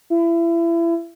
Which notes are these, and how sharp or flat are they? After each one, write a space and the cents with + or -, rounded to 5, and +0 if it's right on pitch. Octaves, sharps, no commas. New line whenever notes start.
E4 +30